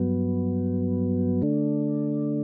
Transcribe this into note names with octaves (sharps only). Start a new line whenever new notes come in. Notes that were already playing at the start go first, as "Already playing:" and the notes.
Already playing: G2 F#3 B3
D3 A3 D4